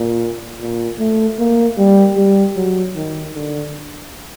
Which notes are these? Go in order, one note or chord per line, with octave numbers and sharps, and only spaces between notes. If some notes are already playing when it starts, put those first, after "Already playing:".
Already playing: A#2
A#2
A3
A#3
G3
G3
F#3
D#3
D3